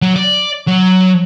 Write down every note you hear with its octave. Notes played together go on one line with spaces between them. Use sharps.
F#3
D5
F#3